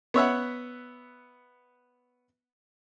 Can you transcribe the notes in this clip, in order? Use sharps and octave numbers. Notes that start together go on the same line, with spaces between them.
B3 C#5 E5 F#5